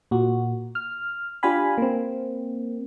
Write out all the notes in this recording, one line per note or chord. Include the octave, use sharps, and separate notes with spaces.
A#2 F#4
F6
D4 F4 G4 F5 G#5 B5
A#3 C4